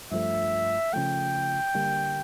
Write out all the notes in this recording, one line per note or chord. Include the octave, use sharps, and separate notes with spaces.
G2 F3 A3 E5
C#3 F3 A3 G5
D3 G3 A#3 D4